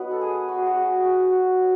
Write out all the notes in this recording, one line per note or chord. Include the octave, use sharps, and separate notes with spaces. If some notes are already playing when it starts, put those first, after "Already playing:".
Already playing: F#3 B3 D#4 B4 D#5 F#5
A4
G#4
F#4
G#4
F#4
G#4
G#4
F#4
F#4
F#3